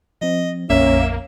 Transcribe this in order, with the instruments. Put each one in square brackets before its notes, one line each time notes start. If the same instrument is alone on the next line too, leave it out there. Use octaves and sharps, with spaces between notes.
[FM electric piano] F3 C4 [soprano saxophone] D#5
[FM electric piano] A#1 F2 [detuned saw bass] A#3 [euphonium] C#4 [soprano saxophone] E5